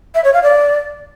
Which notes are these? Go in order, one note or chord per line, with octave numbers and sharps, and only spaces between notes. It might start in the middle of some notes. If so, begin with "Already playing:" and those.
E5
C#5
F5
D5